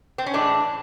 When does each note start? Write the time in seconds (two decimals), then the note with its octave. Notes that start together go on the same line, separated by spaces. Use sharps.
0.18 C4
0.26 C#4
0.33 A2 E3 G#3 D4